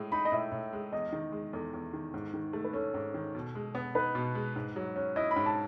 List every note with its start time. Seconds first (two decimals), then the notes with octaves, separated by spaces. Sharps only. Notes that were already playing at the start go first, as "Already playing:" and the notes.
Already playing: A2 G#3
0.12 D#4 B5
0.25 D#5
0.32 A2 E5
0.52 A2
0.73 G#3
0.92 E2 D#5
1.13 D#3
1.32 G#3
1.53 E2 A4
1.74 E2
1.94 D#3
2.14 G#2
2.34 D#3
2.53 A3
2.64 B4
2.73 C#4 A4
2.94 G#2
3.14 D#3
3.35 B2
3.55 G#3
3.75 B3
3.95 D#4 B4
4.15 B2
4.35 G#3
4.56 G#2
4.76 F#3
4.96 C#4
5.16 E4 D#5
5.31 B5
5.36 G#2
5.46 A5